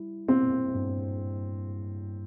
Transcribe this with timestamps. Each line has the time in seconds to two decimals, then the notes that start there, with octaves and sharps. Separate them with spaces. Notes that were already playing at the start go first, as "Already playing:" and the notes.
Already playing: G3 E4
0.28 A#3 C4
0.75 G2